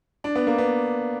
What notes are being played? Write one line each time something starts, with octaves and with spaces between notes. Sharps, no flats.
D4
B3
A#3
B3